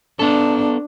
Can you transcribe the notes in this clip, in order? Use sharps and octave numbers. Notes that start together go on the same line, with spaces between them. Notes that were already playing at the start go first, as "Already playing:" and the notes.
B3 D4 A4